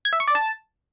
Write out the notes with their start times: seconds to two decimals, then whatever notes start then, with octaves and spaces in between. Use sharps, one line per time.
0.05 G#6
0.13 E5
0.20 C#6
0.27 D5
0.35 A5